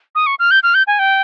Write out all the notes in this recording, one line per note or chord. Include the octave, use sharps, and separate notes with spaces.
D#6
C#6
F6
G6
F6
G6
G#5
G5